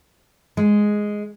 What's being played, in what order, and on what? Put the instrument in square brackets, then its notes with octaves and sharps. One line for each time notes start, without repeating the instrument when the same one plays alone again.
[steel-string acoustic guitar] G#3